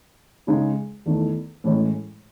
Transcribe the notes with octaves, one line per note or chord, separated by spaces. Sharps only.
C#3 G#3 D#4
E2 D#3 A3
A2 E3 G#3 C#4